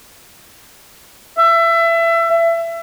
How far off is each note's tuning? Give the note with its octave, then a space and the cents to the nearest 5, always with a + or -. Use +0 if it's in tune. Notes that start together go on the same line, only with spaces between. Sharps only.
E5 +25